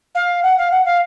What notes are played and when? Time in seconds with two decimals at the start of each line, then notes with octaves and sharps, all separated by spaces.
0.15 F5
0.43 F#5
0.58 F5
0.71 F#5
0.85 F5